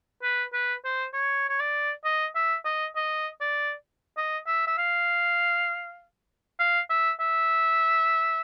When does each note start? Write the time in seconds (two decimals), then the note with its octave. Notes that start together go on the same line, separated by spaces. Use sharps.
0.23 B4
0.53 B4
0.85 C5
1.14 C#5
1.49 C#5
1.60 D5
2.05 D#5
2.36 E5
2.65 D#5
2.96 D#5
3.41 D5
4.17 D#5
4.47 E5
4.68 E5
4.78 F5
6.60 F5
6.90 E5
7.20 E5